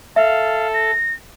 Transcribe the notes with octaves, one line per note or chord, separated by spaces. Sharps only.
A4 E5 F5
A#6